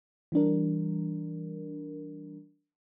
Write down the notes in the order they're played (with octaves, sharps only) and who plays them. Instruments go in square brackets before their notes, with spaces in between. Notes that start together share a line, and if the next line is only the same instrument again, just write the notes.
[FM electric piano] E3 G3 D4 A#4